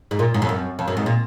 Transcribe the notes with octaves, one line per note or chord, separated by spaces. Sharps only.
G#2
A#2
G#2
F2
F#2
F2
F#2
G#2
A#2